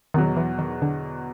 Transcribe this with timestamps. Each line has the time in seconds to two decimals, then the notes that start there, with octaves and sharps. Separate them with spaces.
0.14 E2 B2 D#3 F#3
0.37 E3
0.59 D#3
0.82 D3